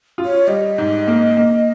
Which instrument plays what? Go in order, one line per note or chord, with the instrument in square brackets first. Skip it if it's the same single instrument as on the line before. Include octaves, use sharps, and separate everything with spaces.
[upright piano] F4
[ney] C#5
[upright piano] G3 [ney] D#5
[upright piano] G#2
A#3
A#3